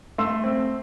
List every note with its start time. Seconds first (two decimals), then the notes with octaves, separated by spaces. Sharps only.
0.18 A3 C6 E6
0.44 C4